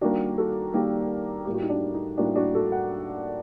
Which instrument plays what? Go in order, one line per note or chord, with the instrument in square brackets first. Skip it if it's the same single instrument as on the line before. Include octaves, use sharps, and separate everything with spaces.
[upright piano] D#3 G3 A#3 D4 F#4
F#4 A4
D#3 G3 A#3 G4 A#4
A2 G3 A#3 G4
F#4
D#4
D4
D#4
A2 G3 A#3 D4 F#4
D4 F#4
F#4 A4
F#5